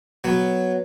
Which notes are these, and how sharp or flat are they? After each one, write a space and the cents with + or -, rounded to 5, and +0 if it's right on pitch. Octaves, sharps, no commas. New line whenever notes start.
F#3 +0 B3 +0